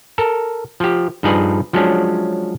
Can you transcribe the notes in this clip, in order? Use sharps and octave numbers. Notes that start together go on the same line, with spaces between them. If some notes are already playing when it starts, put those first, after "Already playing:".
A4 A#4
F3 G4
G2 F3 D#4 G#4 B4 D5
F3 F#3 G#3 C#4 D4